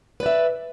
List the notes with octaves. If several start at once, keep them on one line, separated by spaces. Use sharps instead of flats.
B4 D5 E5